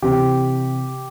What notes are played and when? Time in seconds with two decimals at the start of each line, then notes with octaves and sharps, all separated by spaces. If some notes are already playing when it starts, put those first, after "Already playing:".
0.02 C3 E3 G4